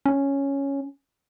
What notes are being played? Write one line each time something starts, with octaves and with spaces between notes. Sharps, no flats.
C#4